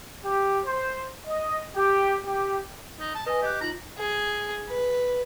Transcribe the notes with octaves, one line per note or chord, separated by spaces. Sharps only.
G4
C5
D#5
G4
G4
D#4
A5
B4 D#5 G#5
G4 D#5 F#6
D#4 F4 A#5 F#7
G#4
B4